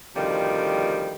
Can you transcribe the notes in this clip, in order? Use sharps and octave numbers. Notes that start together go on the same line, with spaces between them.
D2 C3 D#3 F3 G3